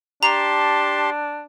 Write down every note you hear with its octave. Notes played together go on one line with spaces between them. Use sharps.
D4 G4 A5 A#5 C6